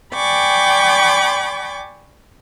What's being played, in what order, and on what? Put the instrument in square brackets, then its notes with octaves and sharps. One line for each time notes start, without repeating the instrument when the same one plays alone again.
[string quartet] D5 G5 G#5 B5 C#6 D6